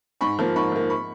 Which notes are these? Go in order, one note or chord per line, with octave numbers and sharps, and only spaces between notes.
G#2 B5 C#6
F3 A#3
G#2 B5 C#6
F3 A#3
B5 C#6